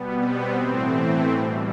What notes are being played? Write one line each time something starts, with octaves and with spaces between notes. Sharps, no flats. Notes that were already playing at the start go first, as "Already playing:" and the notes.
Already playing: B2 G3 B3
C4
A2 E3 A3
B2 G3